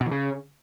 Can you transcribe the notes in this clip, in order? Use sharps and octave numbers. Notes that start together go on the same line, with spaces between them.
B2
E3
C#3